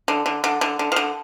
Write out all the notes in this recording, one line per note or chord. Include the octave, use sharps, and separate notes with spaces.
D3
D3
D3
D3
D3
F3
D3